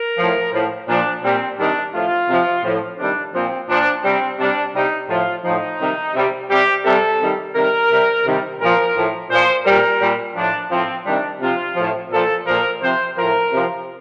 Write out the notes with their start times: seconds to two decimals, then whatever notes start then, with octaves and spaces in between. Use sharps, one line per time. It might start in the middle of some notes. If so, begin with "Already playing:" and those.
Already playing: A#4
0.18 A2 F3
0.53 A2 F3
0.88 A#2 F3 D4
1.23 A#2 G3 C4
1.58 C3 D#3 G3 D4
1.93 A2 F3 F4
2.29 C3 F3
2.64 A2 F3
2.99 C3 D#3 G3 D4
3.34 A#2 F3 C4
3.69 A#2 F3 D4
4.04 C3 G3 C4
4.39 C3 G3 D4
4.74 C3 G3 D#4
5.09 A2 F3 F4
5.44 A2 F3 D#4
5.80 C3 D#3 G3
6.14 C3 G3
6.50 C3 G3 G4
6.85 C3 G3 A4
7.20 C3 D#3 G3
7.55 C3 D#3 G3 A#4
7.90 C3 G3
8.25 C3 D#3 G3
8.60 A#2 F3 A#4
8.96 A2 F3
9.30 A#2 F3 C5
9.65 A#2 G3 A#4
10.01 A#2 G3
10.36 A2 F3 D4
10.71 A2 F3 C4
11.06 C3 D#3 G3 D4
11.41 C3 F3 F4
11.76 A2 F3
12.11 A#2 F3 A4
12.46 A#2 F3 A#4
12.82 C3 F3 C5
13.16 A2 F3 A#4
13.52 C3 F3